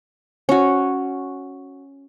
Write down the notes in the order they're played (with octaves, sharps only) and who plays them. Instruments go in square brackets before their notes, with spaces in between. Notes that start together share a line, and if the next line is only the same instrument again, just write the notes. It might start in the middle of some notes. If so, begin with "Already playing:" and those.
[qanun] C#4 F#4